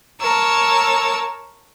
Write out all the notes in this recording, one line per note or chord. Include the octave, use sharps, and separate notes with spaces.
A#4 C#5 A5 E6